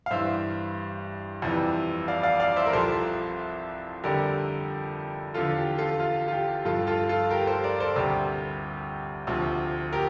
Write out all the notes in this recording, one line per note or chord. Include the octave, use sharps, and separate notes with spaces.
F5
G2 E3 G3 C5 E5
F2 C3 E3 G3
D5 F5
D5 F5
D5 F5
C5 E5
A#4
C2 C3 F3 A4 C5
F2 D3 G3 G4 A#4
E2 D3 F3 F4 A4
G4
F4 A4
F4
F4
G4
G2 F3 F4 A4
F4 A4
F4 A4
G4 A#4
A4 C5
A#4 D5
A4 C5
D2 C3 G3 G4
D2 C3 F3
G4 A#4